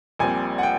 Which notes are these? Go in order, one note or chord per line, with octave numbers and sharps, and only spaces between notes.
A#1 A#2 G3 C4 G#5
F#5
G5